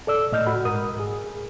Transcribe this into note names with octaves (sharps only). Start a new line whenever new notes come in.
A4 D5 E6
A2 D#5 F6 G6
F#4 F#5 B5
G#2 A#4 D#6
G#4